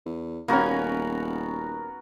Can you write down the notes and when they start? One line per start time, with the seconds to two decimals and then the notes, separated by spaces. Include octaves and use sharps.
0.05 E2
0.48 D#1 A#3 B3 C#4 F#4 A#4